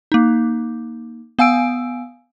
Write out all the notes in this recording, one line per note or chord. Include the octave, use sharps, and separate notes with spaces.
A#3 D#4
B3 F5 G#5 E6 D7